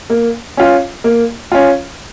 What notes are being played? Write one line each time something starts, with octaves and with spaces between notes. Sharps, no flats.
A#3
C#4 F4
A#3
C#4 F4